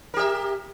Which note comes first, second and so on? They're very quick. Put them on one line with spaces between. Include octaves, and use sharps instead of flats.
A#4 G4 E5